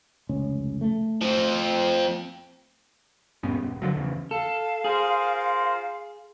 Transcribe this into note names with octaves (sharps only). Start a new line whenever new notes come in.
F1 C#2 C#4
A3
F3 C4
D#1 G2 B3 C#4
E1
D3 F3 F#3
E2 C#3
A4 F5
F4 G#4 A#4 C5